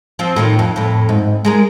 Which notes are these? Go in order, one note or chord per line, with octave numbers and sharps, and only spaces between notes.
F3 C4 F4
A2 D#3 F4
F2
F2 A2
G#2
G#3 G#4 A#4